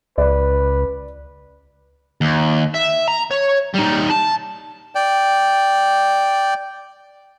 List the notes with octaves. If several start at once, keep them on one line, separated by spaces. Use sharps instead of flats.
C#2 B4 D5
D#2
E5
A#5
C#5
G3 D#4
A5
D5 G5